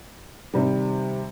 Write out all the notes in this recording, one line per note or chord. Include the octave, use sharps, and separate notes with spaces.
C3 D#3 G3